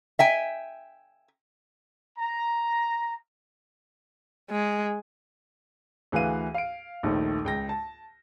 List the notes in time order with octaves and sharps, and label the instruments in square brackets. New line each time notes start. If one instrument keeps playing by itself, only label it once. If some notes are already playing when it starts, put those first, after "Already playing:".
[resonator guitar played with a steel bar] E5 G5 G#5
[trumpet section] A#5
[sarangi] G#3
[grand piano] D2 E3 G#4 B4 F5 D#7
F5 D7
A#1 D#2 D#3 A3
C#2 G5 A#6
A5